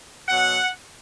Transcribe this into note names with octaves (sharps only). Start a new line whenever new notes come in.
B2 F#3 F#5